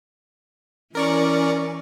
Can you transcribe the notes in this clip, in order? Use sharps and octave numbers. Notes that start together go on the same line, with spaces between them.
E3 C#4 A#4 D5 C#6